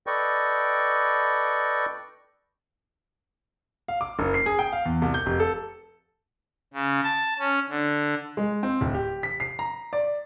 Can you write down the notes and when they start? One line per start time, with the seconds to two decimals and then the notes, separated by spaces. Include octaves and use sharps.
0.07 A4 B4 D5 D#5 G5 C#6
3.88 F5
4.01 D6
4.19 F#1
4.34 C7
4.46 G#4
4.59 G5
4.73 F5
4.86 E2
5.02 C2
5.14 G6
5.26 F1
5.40 A4
6.74 C#3
7.04 A5
7.39 C#4
7.69 D3
8.37 G#3
8.63 C4
8.81 D1
8.95 G4
9.23 B6
9.40 C7
9.59 A#5
9.93 D5